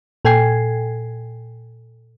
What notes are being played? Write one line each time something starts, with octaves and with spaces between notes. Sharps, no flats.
A#2 A4 G5 G#5 G#6 C7